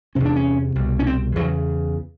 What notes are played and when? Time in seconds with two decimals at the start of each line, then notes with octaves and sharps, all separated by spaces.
0.15 E2 C3 C#4
0.25 D4
0.36 C#4
0.75 C2 B2
0.99 C#4
1.06 C4
1.36 E2 C#3 F#3